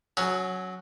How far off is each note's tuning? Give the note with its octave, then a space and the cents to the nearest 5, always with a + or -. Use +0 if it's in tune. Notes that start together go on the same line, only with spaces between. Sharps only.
F#3 +0 C#4 +0 G#4 +40